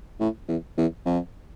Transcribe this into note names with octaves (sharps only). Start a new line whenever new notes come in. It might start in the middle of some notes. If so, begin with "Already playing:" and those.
A2
E2
E2
F2